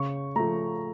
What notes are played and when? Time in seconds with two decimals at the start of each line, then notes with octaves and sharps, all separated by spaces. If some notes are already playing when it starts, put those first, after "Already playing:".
Already playing: C#3 C#6
0.36 F3 A3 A#5